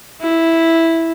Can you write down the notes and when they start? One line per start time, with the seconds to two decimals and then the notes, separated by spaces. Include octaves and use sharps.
0.21 E4